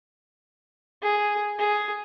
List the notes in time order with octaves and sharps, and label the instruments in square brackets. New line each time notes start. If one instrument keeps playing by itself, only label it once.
[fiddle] G#4
G#4